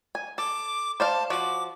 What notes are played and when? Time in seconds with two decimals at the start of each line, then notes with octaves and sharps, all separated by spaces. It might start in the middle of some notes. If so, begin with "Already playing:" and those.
0.15 G#5
0.38 A4 D6
1.00 C5 D5 F5 A5
1.30 F3 F#4 D6